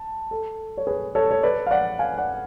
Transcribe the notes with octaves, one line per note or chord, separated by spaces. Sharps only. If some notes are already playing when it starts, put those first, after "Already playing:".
Already playing: A5
A4
C#5
G#4 B4
A4 C#5
C#5
B4 D5
F5
D5 F#5
F5 G#5
D5 F#5